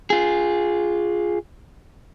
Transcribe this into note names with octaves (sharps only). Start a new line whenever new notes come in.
F4 G#4